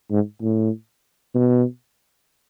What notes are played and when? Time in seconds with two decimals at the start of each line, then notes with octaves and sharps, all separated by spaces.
0.11 G#2
0.42 A2
1.35 B2